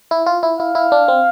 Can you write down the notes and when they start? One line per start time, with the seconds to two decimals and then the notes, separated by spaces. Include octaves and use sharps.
0.11 E4
0.26 F4
0.43 E4
0.59 E4 F5
0.75 E4
0.92 D4
1.08 C4